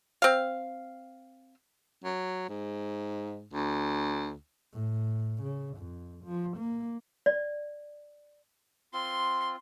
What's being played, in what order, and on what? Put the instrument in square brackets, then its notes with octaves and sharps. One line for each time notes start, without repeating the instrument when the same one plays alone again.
[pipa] C4 F5
[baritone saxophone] F#3
G#2
D2
[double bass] A2
C#3
F2
F3
A#3
[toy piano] D5
[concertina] C4 F4 [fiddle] C6